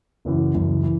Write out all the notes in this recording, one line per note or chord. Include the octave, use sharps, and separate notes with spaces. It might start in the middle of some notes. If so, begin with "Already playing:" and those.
F#1 F#2 E3
F#1 F#2 E3
E3